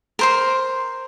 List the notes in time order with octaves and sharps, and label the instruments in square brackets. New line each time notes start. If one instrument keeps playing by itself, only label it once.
[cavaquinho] A#4 C5 C6